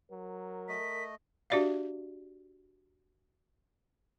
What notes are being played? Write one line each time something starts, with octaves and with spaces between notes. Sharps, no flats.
F#3 A#4
A3 D#5 B6
D4 F#4 G4 D5 E5 F5